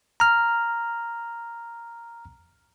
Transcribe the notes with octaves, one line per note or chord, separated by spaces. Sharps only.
A#5 F6